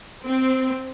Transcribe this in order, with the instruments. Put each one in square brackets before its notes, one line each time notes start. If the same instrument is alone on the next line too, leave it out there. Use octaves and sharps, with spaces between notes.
[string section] C4